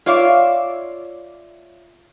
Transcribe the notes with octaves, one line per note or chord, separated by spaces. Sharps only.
F4 C#5 D5 E5 F5